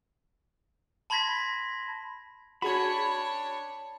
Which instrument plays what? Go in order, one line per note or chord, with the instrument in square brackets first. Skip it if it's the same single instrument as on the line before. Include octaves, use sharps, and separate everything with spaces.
[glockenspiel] A5 B5 C6 G#6 A#6 B6
[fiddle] D4 C#5 [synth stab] F#4 G#4 G#6 [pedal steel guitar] B5